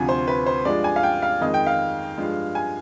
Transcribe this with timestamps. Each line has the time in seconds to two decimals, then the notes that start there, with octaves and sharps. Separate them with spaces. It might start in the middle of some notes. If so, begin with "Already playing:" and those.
Already playing: D2 C3 F3 G#5
0.09 C5
0.28 B4
0.46 C5
0.65 G2 F3 G#3 D5
0.84 G#5
0.96 F5
1.03 G5
1.22 F5
1.41 F2 D#3 G#3 D#5
1.54 G5
1.67 F5
2.17 G2 F3 G#3
2.55 G#5